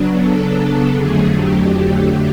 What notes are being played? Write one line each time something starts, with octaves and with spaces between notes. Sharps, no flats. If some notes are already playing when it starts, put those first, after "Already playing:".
Already playing: C#3 F#3 B3 D4
A4
F2 D3 F#3 A3 G#4
G4